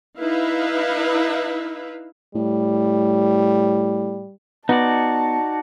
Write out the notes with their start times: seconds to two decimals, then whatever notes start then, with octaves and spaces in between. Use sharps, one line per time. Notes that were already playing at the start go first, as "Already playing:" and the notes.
0.19 D#4 E4 B4 E5 F5
2.35 A2 G3
4.69 B3 D#4 F#4 D5 A5